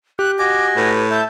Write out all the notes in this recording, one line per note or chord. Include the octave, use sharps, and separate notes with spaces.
G4 F#6
F#4 D#5 G#5 D6
A2 B4
E5 A5 G6